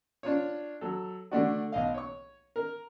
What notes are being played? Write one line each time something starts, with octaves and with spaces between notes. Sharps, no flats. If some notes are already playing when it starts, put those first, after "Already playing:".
D4 F4 C#5
F#3 A4
D3 A3 D4 F#4
B1 D#5 F5
C#5 C#6
A#4